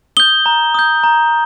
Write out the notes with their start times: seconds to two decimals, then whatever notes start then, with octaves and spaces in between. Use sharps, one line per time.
0.17 D#6 G6 G7
0.46 A#5
0.74 D#6 G6
1.04 A#5